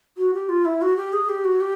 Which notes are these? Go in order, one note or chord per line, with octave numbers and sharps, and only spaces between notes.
F#4
G4
F4
E4
F#4
G4
G#4
G4
F#4
G4